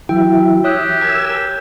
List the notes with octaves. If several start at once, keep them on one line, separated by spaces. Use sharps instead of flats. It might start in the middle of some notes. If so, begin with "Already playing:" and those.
E3 F#3 E4 G5
G4 C#5 E5 D#6 F#6
A#4 G#5 E6